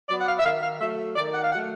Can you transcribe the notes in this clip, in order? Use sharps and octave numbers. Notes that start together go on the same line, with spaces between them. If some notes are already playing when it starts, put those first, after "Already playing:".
F#3 B3 D5
F#5
F5
E5
D#3 F5
F5
F#3 A3 E5
D#3 D5
F#5
F5
F#3 A3 F#5